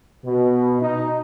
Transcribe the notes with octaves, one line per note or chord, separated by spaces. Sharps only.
B2
D#4